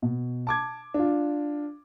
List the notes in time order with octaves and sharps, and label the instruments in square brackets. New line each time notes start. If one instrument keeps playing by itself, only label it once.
[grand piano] B2
A5 D6 G#6
D4 F4